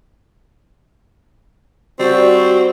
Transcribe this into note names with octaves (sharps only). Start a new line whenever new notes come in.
G3 C4 F#4